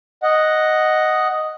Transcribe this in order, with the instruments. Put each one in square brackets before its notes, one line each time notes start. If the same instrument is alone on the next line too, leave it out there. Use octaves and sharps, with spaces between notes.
[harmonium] D#5 F#5